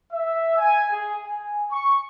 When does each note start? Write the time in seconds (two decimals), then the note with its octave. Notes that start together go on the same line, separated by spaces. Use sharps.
0.12 E5
0.58 G#5
0.91 G#4
1.25 G#5
1.71 C#6